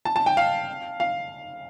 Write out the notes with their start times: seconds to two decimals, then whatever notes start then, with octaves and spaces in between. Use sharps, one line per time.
0.05 A5
0.16 A5
0.26 G5
0.37 F5
1.00 F5